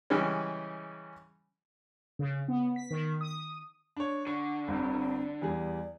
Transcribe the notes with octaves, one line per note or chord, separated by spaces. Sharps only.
C#3 E3 G3 G#3 C#4
C#3
B3
B6
D#3
D#6
D4 C#5
D3 C#6
G1 G2 C4
E2 G3 G#4 D5